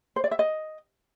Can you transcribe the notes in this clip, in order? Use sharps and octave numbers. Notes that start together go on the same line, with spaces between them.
C5
D5
E5
D#5